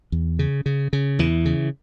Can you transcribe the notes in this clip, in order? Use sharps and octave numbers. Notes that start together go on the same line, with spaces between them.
E2
C#3
C#3
C#3
E2 E3
C#3